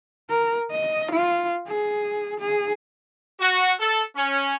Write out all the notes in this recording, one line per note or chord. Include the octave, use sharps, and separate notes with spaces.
A#4
D#5
F4
G#4
G#4
F#4
A4
C#4